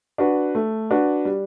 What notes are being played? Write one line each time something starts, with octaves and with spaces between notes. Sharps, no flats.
D4 F#4 B4
A3
D4 F#4 B4
G3